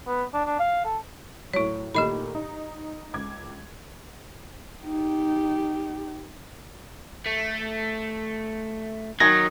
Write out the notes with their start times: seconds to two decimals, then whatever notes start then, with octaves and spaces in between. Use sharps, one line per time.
0.07 B3
0.34 D4
0.46 D4
0.59 F5
0.85 A4
1.54 A2 F#3 E4 C#5
1.95 A#2 D#3 A3 G4 D#5 B5
2.35 D#4
3.13 C#2 D6 G#6
4.84 D#4 G4
7.26 A3
9.20 D#3 F#3 G#5 A#6